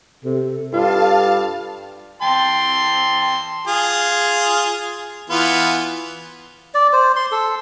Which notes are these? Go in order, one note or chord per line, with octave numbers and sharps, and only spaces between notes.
C3 A4
G2 F4 F5 A5
G5 A5 C6
F4 G#4
E3 B3 F4
D5
C5
C6
A4